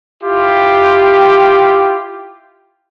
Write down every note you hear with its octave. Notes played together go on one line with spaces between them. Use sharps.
E4 F4 G4